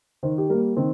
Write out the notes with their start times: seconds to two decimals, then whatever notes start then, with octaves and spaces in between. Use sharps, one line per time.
0.23 D#3 C5
0.38 G4
0.49 G3 A#3 A#4
0.77 D#3 C4